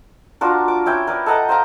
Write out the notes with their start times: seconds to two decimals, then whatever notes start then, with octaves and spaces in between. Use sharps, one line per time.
0.41 D4 F4 F#4 A#4
0.68 D6
0.86 C#4 E4 G5
1.07 A#4 B4 D5
1.26 A4 D#5 F#5 A#5
1.49 C5 F5 G5 A#5